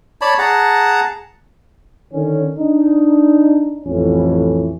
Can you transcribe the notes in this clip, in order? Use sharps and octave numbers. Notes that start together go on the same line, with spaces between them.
C#5 D5 A5 B5
G#4 F#5 A5 A#5
D3 D#3 C#4
D4 D#4
A1 F2 E3 C#4